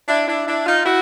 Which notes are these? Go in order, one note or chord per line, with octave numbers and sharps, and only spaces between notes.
D4 E4
D4 E4
D4 E4
D#4 F4
E4 F#4